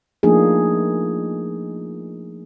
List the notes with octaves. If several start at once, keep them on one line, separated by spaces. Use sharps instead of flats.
F3 A3 A#3 D4 D#4 G#4